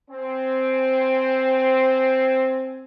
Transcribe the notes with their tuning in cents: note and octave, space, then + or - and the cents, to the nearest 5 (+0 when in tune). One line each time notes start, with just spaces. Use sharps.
C4 +0 G#5 +5